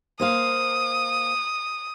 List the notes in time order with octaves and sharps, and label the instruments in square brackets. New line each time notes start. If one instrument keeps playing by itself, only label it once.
[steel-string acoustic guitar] A#3 C5 F5 [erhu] D#6